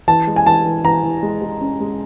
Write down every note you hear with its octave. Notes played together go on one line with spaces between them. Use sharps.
E3 A5
G#3
G#5
E3 A5
E3
E3 A#5
E3
G#3
G#3
C#4
G#3